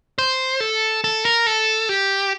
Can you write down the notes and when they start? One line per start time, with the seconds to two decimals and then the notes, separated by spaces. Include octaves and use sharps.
0.19 C5
0.60 A4
1.04 A4
1.25 A#4
1.47 A4
1.89 G4